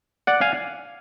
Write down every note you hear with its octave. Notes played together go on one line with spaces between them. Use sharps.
D5 F#5
F5 G#5